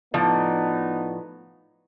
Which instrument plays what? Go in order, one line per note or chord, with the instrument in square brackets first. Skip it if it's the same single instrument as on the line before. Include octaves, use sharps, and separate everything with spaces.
[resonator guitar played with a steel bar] A2 F3 D5 [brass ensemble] B3 D#4